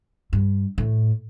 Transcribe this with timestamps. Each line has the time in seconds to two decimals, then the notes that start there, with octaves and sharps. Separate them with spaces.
0.33 G2
0.78 A2